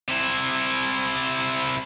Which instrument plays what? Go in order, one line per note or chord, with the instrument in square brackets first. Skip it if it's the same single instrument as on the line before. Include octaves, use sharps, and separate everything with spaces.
[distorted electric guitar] C3 E4